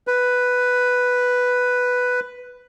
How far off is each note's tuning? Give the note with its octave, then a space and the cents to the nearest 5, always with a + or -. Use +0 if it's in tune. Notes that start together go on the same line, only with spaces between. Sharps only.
B4 +5